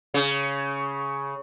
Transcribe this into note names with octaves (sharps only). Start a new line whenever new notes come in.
C#3